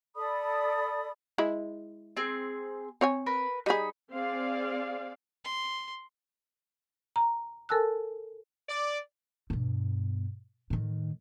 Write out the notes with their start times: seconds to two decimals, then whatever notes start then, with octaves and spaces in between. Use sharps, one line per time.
0.16 A4 D5 B5 D#6
1.38 G#3 E4 B5
2.17 C4 G#4
3.01 C4 C#5 G#5
3.26 A#4 B4 B5
3.66 G3 D#4 G#4 B5
4.13 C4 G#4 D5 F5
5.45 C6
7.16 A#5
7.69 A4 A#4 G#5 A5 E6 F#6
8.69 D5
9.50 G2 B2
10.70 A2 D#3